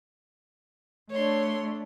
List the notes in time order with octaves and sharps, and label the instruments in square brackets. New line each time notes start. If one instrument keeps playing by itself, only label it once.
[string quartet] A3 D4 [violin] C#5 C6